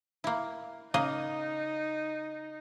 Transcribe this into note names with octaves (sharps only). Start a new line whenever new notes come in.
A#3 E4
C#3 A#3 D#4 D#5